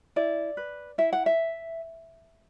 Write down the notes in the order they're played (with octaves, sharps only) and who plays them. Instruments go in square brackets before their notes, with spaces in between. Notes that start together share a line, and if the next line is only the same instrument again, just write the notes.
[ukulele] E4 D5
B4
E4 E5
F#5
E5